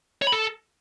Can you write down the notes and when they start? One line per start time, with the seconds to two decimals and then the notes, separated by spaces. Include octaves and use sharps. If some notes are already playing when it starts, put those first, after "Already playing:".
0.22 C#5
0.27 B5
0.32 A4